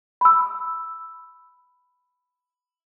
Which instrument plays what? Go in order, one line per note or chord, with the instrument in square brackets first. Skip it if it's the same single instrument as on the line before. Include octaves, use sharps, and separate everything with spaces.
[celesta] B5 E6